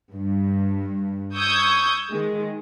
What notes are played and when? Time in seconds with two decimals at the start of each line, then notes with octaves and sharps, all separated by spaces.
0.13 G2
1.37 C#6 D#6 E6 G6 G#6
2.10 D#3 G#3